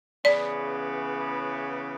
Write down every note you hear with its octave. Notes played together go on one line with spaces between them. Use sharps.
C#3 E3 B3 D5